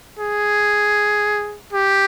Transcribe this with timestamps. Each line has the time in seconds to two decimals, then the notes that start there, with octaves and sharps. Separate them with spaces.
0.19 G#4
1.73 G4